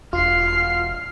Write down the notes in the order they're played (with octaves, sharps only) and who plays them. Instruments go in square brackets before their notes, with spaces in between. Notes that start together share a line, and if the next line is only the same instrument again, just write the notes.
[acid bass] E1 [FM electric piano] F4 [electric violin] F6 C7